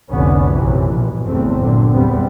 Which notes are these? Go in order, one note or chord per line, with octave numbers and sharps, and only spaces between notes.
F1 C2 D3 B3 C#4
A#1 F#2 C3 E3
G2 B2
G1 E2 A3 C4
A#2 D3 F#3
E2 G3 B3 C4